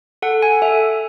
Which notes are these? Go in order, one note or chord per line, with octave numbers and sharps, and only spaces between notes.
A4 F#5
G#5
A4 E5